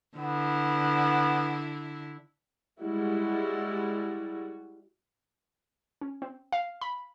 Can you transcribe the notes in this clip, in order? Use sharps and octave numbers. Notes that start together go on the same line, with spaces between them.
D3 B3 E4
G3 G#3 E4 F#4
C#4
C4
F5
B5